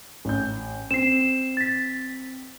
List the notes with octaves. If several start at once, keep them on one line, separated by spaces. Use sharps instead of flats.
A1 G6
C4 C7 E7
A6 B6